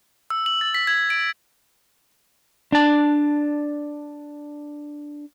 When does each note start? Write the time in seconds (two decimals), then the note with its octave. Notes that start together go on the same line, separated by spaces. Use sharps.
0.30 E6
0.46 F#7
0.61 A6
0.74 B6
0.87 G#6
1.10 D7
2.72 D4 A5